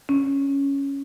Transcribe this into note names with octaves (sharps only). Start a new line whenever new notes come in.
C#4